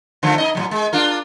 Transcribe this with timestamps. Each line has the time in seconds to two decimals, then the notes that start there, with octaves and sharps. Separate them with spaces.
0.23 D3 F3 A3
0.38 D#4 D#5
0.55 A2 F3 F#3
0.71 G#3
0.93 D4 F4 A#4